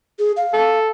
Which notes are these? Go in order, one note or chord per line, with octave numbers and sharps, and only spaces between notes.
G#4
F5
A4